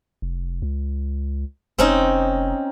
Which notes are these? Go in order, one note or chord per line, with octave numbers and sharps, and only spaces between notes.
F1
C#2
F1 C4 C#4 D#4